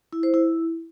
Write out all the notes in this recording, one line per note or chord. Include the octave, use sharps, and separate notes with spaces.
E4
C5
E4